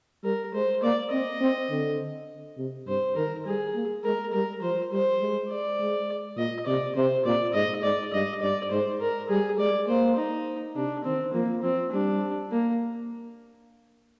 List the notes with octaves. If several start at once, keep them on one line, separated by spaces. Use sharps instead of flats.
G3 A#4
G#3 C5
A#3 D5
C4 D#5
C4
D3
C3
G2 C5
D#3 A#4
G3 G#4
A#3
G#3 A#4
G3 A#4
F3 C5
G3 C5
G#3
D5
G#3
A#2 D#5
C3 D5
C3 C5
A#2 D5
G#2 D#5
G#2 D5
G2 D#5
G2 D5
G#2 C5
A#4
G3 G#4
G#3 D5
A#3 C5
D#4
C3 D4
D#3 C4
F3 A#3
F3 C4
G3 D4
A#3